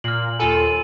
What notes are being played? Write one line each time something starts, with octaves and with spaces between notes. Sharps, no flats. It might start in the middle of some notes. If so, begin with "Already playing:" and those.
A#2 F6 F#7
D#2 F4 A4 G#5 B5 D#7